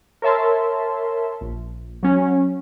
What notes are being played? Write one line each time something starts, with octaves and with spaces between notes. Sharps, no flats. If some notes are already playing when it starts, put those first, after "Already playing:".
A#4 C#5 E5 A5 C6
A#1
F#3 C#4